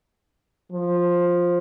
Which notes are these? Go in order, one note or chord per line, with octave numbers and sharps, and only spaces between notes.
F3